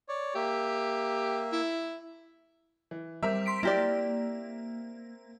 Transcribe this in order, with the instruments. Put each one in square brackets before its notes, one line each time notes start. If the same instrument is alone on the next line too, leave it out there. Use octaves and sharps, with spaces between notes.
[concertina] C#5 D5
[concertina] A#3 E5 [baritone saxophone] G4
[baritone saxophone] E4
[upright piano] E3
[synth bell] G3 [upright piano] C4 A#4 E5
[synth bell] C6 B6 D7
[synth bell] A#3 [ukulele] E4 G4 D5